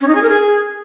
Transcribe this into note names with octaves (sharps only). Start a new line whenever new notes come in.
C#4
D#4
G#4
A#4
G#4